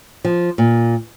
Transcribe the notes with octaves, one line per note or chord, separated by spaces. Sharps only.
F3
A#2